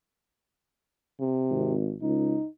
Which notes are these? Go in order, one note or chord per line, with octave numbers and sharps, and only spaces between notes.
C3
G#1
C#2 D#4